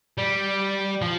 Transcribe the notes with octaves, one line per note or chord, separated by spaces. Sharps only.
G3
F3